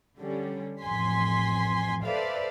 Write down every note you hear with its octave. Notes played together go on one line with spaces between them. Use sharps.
D3 G3 C#4
A1 F2 G#5 C6 B6
A4 B4 C5 D5 E5 F5